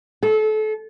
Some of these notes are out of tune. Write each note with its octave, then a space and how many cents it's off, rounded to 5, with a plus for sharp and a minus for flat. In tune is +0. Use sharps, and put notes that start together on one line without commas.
A4 -30